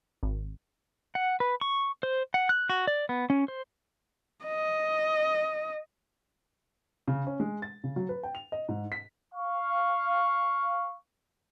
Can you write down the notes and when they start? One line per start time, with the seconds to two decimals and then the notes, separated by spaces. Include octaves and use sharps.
0.23 G#1
1.15 F#5
1.40 B4
1.61 C#6
2.03 C5
2.34 F#5
2.49 F#6
2.70 F#4
2.87 D5
3.09 B3
3.30 C#4
3.48 C5
4.45 D#5
7.08 C#3
7.27 C#4
7.40 G#3
7.62 A6
7.84 C#3
7.96 F#3
8.09 B4
8.23 G5
8.35 F7
8.52 D#5
8.69 G#2
8.92 B6
9.34 F5 C#6